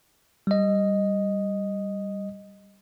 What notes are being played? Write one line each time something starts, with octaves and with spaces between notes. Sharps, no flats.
G3 D#5